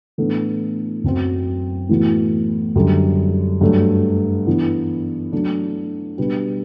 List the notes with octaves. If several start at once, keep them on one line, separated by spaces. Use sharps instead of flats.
A2 E3 B3 D4 A4
F#2 F#3 C4 F#4 C5
A2 E3 B3 F#4
F#2 D3 G3
G2 F#3 A3
E3 B3 D4
F#3 A3 D4
B2 G3 D4 G4 B4